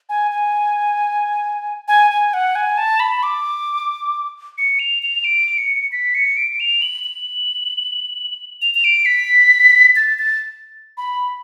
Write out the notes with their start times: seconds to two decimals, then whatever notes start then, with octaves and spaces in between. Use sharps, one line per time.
0.09 G#5
0.31 G#5
1.88 G#5
2.11 G#5
2.34 F#5
2.55 G#5
2.78 A5
3.00 B5
3.23 D6
4.58 C#7
4.79 F7
5.03 F7
5.24 D7
5.58 C#7
5.92 B6
6.15 C#7
6.37 D7
6.60 F7
6.82 F#7
7.04 F#7
8.62 F7
8.75 F7
8.84 D7
9.06 B6
9.96 A6
10.19 A6
10.97 B5